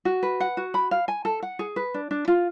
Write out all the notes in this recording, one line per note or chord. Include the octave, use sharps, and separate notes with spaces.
F#4
B4
F#5
F#4
B5
F5
G#5
A4
F#5
G#4
B4
D4
D4
F4